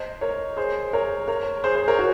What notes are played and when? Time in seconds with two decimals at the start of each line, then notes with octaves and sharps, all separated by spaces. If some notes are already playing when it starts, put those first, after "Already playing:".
Already playing: C5 D#5
0.21 A#4 C#5
0.57 G#4 C5
0.93 A#4 C#5
1.28 A#4 C#5
1.64 G#4 C5
1.75 G#4 C5
1.88 A#4 C#5
1.99 F#4